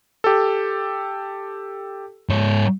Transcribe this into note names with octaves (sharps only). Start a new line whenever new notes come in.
G4 A4
G#2 C#5